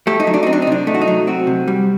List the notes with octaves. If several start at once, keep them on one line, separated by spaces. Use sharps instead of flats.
A3 G4
D#4
F#3
D4
C4 D#4
D4
D#4
C3 D4
A3 D#4
F#4
D#4
F#3
C4 F#4
C3
G3